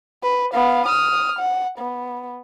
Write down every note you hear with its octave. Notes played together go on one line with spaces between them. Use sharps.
B4
B3 F5
D#6 F6
F#5
B3